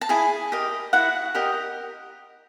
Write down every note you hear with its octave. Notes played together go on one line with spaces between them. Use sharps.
A5
E4 G#4 G#5
G4 A#4 D#5
E4 F#4 F#5
G4 A#4 D#5